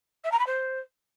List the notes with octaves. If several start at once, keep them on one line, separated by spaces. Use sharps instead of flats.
E5
A#5
B5
C5